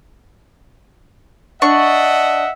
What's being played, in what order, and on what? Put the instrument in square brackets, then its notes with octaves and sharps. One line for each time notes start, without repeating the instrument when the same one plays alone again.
[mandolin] D4 C#6 [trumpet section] D#5 E5 F#5